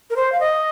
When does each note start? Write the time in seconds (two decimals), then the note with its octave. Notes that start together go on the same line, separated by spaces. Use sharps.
0.10 A#4
0.16 C5
0.32 F5
0.40 D#5